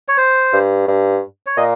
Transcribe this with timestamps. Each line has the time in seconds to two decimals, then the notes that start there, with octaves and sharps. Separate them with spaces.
0.08 C#5
0.17 C5
0.53 G2
0.88 G2
1.46 C#5
1.57 A#2 D#5